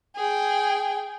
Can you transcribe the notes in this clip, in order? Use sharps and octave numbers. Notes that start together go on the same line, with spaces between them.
G#4 G5